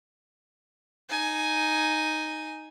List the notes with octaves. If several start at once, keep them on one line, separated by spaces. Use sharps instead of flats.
D#4 G#5